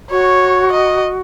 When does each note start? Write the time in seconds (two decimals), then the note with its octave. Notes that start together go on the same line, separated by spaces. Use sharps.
0.11 F#4 C#5
0.73 D#5